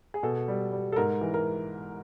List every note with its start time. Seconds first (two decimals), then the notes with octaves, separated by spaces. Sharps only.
0.14 G#4
0.23 B2 A4
0.48 G3
0.72 G3
0.92 A4
0.96 G#2 A#4
1.21 E3
1.34 A#4